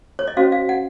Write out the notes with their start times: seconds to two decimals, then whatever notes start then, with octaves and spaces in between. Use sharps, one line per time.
0.19 C#5
0.27 D#5
0.37 C#4 F#4 C5 F5
0.52 F5
0.69 F#5